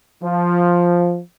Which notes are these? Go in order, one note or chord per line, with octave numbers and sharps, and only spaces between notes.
F3